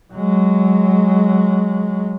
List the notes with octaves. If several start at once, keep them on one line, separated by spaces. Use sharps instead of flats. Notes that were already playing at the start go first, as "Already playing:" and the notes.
F#3 G#3